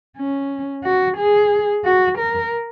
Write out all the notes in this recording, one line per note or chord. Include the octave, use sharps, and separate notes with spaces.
C#4
F#4
G#4
F#4
A#4